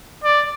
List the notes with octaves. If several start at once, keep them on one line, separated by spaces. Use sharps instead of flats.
D5